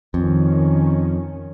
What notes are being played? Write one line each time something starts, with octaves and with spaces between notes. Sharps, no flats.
F2 D#3 C#4